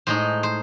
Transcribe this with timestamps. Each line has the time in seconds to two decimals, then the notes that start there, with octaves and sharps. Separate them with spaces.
0.07 A2 G#3 D#4 C5
0.43 C5